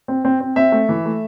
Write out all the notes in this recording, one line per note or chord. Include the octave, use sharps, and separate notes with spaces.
C4
C4
C4
C4 E5
A3
E3
A3